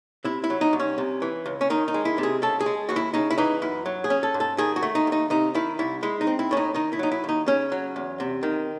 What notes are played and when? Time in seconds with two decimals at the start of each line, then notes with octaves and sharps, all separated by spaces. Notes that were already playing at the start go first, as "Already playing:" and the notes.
0.24 C3 E4
0.44 E4
0.50 F#3
0.61 D#4
0.73 C2
0.80 C#4
0.98 C3
1.22 E3
1.46 C#2
1.61 C#4
1.70 D#3 D#4
1.88 D#4
1.94 G#3
2.05 E4
2.18 C3
2.23 G#4
2.42 C#3 A4
2.60 G#4
2.66 G#3
2.89 D#2 F#4
2.96 E4
3.14 C#3 D#4
3.31 E4
3.38 E3 D#4
3.62 F#2 E4
3.86 F#3
4.04 G#4
4.10 C#4
4.23 A4
4.34 G#2
4.40 A4
4.58 D#3 G#4
4.76 F#4
4.83 A3
4.95 D#4
5.07 D#2
5.12 D#4
5.30 C3 D#4
5.55 D#3 E4
5.79 C2 E4
6.03 G#3 E4
6.21 D#4
6.27 C4
6.39 E4
6.51 A2 C#4
6.57 D#4
6.74 D#3 D#4
6.93 E4
6.99 F#3 D#4
7.12 E4
7.24 D#2 D#4
7.47 C#3 C#4
7.72 F#3
7.96 E2
8.20 C3
8.43 D#3